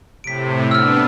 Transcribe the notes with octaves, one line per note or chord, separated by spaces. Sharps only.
A2 C3 B6 D7
B3 D4 E6 F6